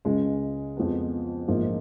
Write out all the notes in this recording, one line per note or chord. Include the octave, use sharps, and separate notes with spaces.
C#2 C#3 G#3
F2 F3 G#3 B3
A#1 G#2 F3 A#3